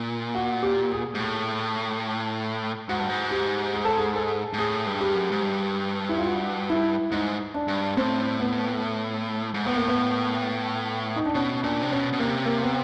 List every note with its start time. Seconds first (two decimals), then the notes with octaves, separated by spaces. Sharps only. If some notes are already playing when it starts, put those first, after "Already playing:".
Already playing: A#2
0.35 F#4
0.63 G4
0.92 G#4
1.15 G#2
1.19 A2
2.89 G#2 F#4
2.99 G2
3.09 G#2
3.31 G4
3.74 G#4
3.85 A4
3.97 G#4
4.16 A4
4.53 G#2
4.58 A2 G#4
4.86 G2
5.00 G4
5.14 F#2
5.31 G#2
5.43 G2
6.09 E4
6.18 F4
6.27 F#4
6.70 E4
7.11 G#2 D#4
7.54 D4
7.68 G2
7.97 A2 C4
8.39 B3
9.54 G#2
9.66 A2 B3
9.76 A#3
9.88 B3
11.16 D#4
11.26 D4
11.35 B2 C#4
11.63 A#2 D4
11.82 C3
11.91 B2 C#4
12.13 B2
12.19 C3 A#3
12.46 A#3
12.62 B3